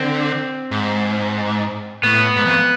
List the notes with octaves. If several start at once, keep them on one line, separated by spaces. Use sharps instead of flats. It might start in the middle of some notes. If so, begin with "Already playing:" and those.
Already playing: D3 C4
G#2
A2 B3
G#2
F2